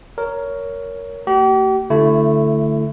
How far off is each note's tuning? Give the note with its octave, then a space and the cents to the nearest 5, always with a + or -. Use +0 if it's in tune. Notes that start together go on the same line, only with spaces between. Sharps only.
A#4 +0 C#5 +15
A3 +45 G4 -40
D3 -10 A3 +0 E4 +25